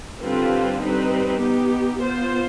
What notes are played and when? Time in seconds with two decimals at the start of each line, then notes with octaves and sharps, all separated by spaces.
0.21 D3 G3 C4 F4 B4
0.81 G3 C4 D#4 B4
1.40 B3 D#4 G4
1.99 B3 F4 C5